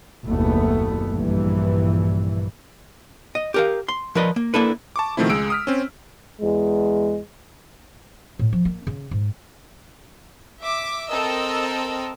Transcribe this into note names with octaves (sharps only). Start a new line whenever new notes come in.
F#1 D#2 B2 A3 B3
A#1 G2 E3
D#5
G4 A#4 F5
C6
F3 A#4 B4 D5 D#5
A#3
A#3 D4 E4 A4 B4
A5 C#6 D6
B2 D#3 F3 A3 C4 E4
C#2 G#3 E6 D7
D#6 F6 B6
C4 C#4
E2 G#3
A2
F3
A#3
C#3
G#2
E5 D6
C4 A4 A#4 D#5 E6